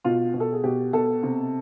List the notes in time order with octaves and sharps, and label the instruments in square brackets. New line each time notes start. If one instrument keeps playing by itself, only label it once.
[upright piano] B2 F4
B2
A4
G#4
B2 G4
B2 A4
C3